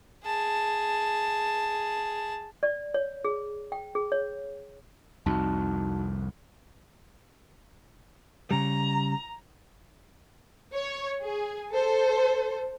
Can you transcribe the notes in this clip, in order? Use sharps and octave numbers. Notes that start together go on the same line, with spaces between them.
G#4 A5
D5
C#5
G#4
G5
G#4
C#5
C2 F2 D#4 F#4 A5
C#3 G3 A#5
C#5
G#4
A4 C5